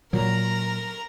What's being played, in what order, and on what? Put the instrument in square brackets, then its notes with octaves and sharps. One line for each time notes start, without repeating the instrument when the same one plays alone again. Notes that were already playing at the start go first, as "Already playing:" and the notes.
[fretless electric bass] A#2 F#3 [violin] A#4 A#5